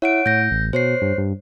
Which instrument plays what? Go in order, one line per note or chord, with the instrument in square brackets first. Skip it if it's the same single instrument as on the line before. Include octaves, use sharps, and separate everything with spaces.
[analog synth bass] E4 [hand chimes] C#5 F#5 D7
[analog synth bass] A2 [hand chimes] G6 A#6
[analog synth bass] A1
[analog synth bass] B2 [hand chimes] C5 C#5 C7
[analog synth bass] G2
G2